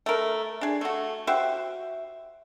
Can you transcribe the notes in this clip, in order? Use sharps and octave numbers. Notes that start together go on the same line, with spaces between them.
A3 A#4
D4 G#4
A3 F#4
F#4 G4 C5 E5